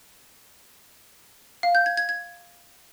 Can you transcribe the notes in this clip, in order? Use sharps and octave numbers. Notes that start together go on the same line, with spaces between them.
F5
G6
G#6
G#6
G#6